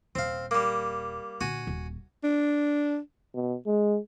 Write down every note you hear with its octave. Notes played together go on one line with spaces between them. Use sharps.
D#1 C4 F5
G3 A#3
A#2 D3 F#4 G#5
D#1
D4
B2
G#3